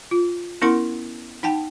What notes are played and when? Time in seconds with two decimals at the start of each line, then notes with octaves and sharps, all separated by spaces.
0.11 F4
0.61 B3 C#4 E4 A#4 F#5 C6
1.43 D#4 F#5 G5 A5